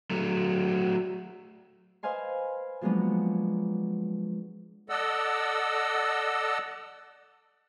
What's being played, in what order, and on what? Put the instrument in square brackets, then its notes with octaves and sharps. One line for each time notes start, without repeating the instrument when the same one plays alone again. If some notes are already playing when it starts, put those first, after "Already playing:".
[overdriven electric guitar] F#3 A3
[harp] B4 C5 D#5 F5 G#5 C6
F3 F#3 G#3 A#3 B3 D4
[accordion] A4 D5 D#5 F#5 E6